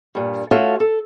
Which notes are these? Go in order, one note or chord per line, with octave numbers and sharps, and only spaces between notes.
G2 A#2
A3 F4 F#4 A4 C#5
A4